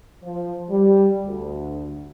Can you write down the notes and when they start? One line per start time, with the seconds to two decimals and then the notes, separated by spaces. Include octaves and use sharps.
0.23 F3
0.70 G3
1.25 D2